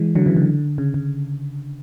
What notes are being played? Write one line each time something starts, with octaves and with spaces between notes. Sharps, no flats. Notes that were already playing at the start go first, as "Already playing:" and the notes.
Already playing: E3 G#3
D3 F#3
C#3 E3
D3
C#3
C#3